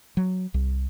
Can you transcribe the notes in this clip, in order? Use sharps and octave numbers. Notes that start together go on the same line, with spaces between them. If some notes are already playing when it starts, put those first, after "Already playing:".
F#3
C2